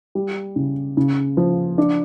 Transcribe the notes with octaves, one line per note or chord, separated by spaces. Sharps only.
G3
C#3
C#3
F3
D4